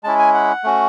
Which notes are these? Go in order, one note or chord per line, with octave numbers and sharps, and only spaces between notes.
G#3 C#4 E4 A5
G#5
F#5
A3 C#4 F#4